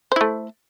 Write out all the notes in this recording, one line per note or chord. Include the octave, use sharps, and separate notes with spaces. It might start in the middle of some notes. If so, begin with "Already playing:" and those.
A3 E4 C5